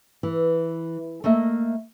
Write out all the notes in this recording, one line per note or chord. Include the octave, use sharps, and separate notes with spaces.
E3
A3 A#3 D#5 E5